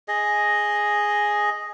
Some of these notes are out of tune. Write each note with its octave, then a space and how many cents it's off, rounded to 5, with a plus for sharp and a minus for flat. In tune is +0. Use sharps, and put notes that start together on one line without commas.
G#4 +0 D#5 +0